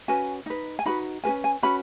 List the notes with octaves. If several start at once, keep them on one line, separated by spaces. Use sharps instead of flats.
C#4 F#4 B4 G#5
D#4 B4
G#5
D#4 F#4 B4 B5
C#4 F#4 B4 G#5
G#5
C#4 F#4 B4 B5